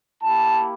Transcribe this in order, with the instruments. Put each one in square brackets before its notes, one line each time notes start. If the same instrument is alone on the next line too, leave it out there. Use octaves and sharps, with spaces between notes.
[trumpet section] A#3 E4 G4 A5